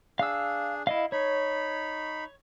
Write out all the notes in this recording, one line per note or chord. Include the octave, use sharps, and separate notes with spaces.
D4 G#4 F5 E6
E4 D#5 F5
D#4 C#5 B5